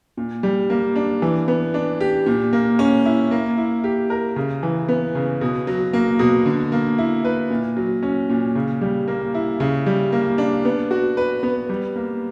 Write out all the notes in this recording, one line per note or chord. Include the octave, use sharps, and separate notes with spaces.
A#2
G3
A#3
D4
E3
B3
D4
G4
A#2
A#3
C#4
E4
A#3
E4
G4
A#4
C#3
E3
B3
C#3
B2
F#3
A#3
B2
D3
A#3
E4
B4
A#2
F#3
C#4
A#2
C#3
G3
A#3
E4
C#3
G3
A#3
D4
B3
F#4
B4
B3
G3
A#3